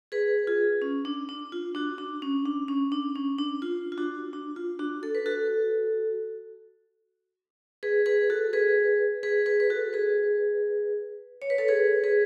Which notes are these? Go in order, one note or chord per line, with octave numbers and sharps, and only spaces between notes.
G#4 B4
F4 G#4
C#4
D4
D4
F4
D4 F#4
D4
C#4
D4
C#4
D4
C#4
D4
F4
F4
D4 F#4
D4
F4
D4 F#4
A4
B4
F#4 A4
G#4 B4
G#4 B4
F#4 A4
G#4 B4
G#4 B4
G#4 B4
B4
F#4 A4
G#4 B4
C#5
B4
A4 C#5
G#4 B4
G#4 B4